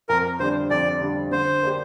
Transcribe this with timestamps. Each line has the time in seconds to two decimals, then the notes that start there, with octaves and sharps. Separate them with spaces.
0.09 F2 A#4
0.40 D3 G3 D4 C5
0.70 F2 D5
1.01 D3 G3 D4
1.31 D3 C5
1.62 A#3 D4 G4